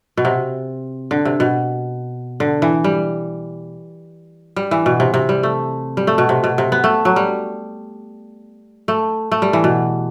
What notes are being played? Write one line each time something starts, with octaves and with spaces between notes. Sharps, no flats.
B2
C3
D3
C3
B2
D3
E3
G3
G3
E3
B2
C3
C3
G3
A3
G3
A3
B2
C3
B2
C3
B3
A3
F#3
G3
A3
A3
G3
E3
B2